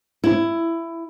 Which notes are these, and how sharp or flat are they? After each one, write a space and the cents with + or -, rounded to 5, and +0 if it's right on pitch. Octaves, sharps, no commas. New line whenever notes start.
E4 +15